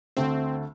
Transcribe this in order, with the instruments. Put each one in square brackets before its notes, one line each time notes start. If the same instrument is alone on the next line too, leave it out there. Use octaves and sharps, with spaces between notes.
[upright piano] D2 D3 A3 [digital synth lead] C4